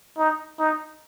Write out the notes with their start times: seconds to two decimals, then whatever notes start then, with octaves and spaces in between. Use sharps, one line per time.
0.17 D#4
0.59 D#4